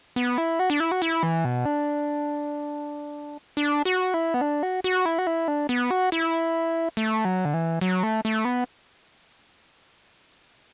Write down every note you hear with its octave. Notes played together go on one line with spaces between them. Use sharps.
B3
E4
F#4
D4
E4
F#4
E4
E3
B2
D4
D4
F#4
E4
B3
D4
F#4
F#4
E4
F#4
E4
D4
B3
F#4
E4
A3
F#3
D3
E3
F#3
A3
A3
B3